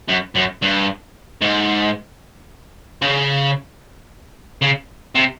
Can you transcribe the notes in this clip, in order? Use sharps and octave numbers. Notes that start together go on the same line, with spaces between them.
F#2
F#2
G2
G#2
C#3
C#3
C3